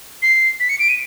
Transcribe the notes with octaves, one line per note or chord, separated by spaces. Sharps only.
C7
B6
C#7
D7
D#7